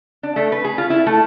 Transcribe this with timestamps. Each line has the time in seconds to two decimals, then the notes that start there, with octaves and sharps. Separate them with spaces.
0.23 D4
0.36 A3
0.52 B4
0.65 G#4
0.78 F4
0.90 E4
1.06 A3